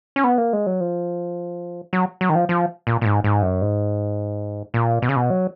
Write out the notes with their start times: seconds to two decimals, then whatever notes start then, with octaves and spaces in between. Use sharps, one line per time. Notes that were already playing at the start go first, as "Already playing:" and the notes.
0.16 C#4
0.24 B3
0.38 A#3
0.53 G#3
0.67 F#3
0.80 F3
1.93 F#3
2.21 F#3
2.29 D#3
2.35 F3
2.49 F3
2.87 A#2
3.01 A#2
3.05 G#2
3.24 G#2
3.42 F#2
3.62 G#2
4.74 A#2
5.02 B2
5.09 C#3
5.16 B2
5.30 F#3